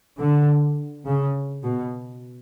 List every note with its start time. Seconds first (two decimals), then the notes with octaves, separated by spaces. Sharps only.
0.19 D3
1.06 C#3
1.64 B2